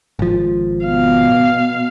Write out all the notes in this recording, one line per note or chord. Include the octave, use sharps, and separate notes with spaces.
G#1 F3
B2 F5